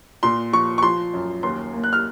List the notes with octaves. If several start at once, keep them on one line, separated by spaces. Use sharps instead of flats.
A#2 C6
F3 C#6
C#6
F3 C6
F#2
D#2 C6
A#3
F#6
F6